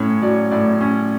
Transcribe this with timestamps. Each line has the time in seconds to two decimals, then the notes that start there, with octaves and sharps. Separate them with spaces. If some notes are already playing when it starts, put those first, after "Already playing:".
Already playing: A2 C#4 C#5
0.22 F#3 D5
0.51 A2 D5
0.81 C#4